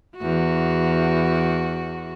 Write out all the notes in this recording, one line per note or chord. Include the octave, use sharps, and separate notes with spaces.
E2 F#4